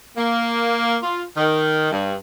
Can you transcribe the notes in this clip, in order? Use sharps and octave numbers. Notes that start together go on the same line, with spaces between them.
A#3
F4
D#3
G2